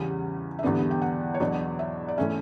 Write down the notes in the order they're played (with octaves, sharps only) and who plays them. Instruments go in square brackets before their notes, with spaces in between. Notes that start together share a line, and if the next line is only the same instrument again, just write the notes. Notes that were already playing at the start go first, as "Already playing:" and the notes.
Already playing: [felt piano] E2 C#3 G3 C#4 F#5
E5
E2 D3 G3 B3 D4 D5
G5
F#5
C#5
E2 B2 F#3 B3 D4 D5
E5
D5
E3 A3 C#4 E5